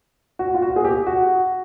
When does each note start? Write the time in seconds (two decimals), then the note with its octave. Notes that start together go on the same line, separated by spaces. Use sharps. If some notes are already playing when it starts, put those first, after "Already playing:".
0.39 F#4
0.54 F4
0.62 F#4
0.76 G#4
0.85 G4
1.07 F#4